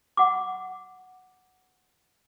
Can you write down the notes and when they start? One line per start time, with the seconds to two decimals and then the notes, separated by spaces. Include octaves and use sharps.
0.17 F#5 D6